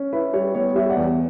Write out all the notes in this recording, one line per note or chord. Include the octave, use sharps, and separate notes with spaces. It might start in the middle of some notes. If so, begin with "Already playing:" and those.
Already playing: C#4
E4 B4
G3 C#5
B3 C#5
G3 C#5 E5
D5 F#5
E2